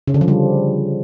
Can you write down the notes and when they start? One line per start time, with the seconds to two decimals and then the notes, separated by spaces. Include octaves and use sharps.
0.07 C#3
0.14 D3
0.21 F3
0.28 G3